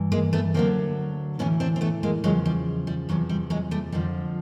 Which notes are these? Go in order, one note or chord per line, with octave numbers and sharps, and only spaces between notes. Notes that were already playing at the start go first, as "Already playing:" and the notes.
Already playing: G2 E3
G#3 A#3
A3 B3
D2 D3 F#3 A#3 C4
A2 E3 B3 C#4
C4 D4
C4
A3 B3
G#3 A#3
E2 C#3 F3 F#3 G#3
G3
G3
E2 C3 F3 F#3
G3
F#3 G#3
G3 A3
F2 D3 F3 G3